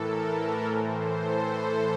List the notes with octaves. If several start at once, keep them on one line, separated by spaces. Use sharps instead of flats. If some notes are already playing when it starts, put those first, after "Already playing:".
Already playing: A2 E3 A4 A#4
B4
A2 E3 C5
A4